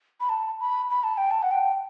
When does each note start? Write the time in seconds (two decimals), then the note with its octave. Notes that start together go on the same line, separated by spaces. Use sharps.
0.20 B5
0.29 A5
0.60 B5
0.90 B5
1.04 A5
1.17 G5
1.31 A5
1.43 F#5
1.51 G5